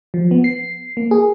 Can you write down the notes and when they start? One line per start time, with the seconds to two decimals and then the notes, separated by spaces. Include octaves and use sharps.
0.14 F3
0.31 B3
0.44 C7
0.97 A#3
1.11 G#4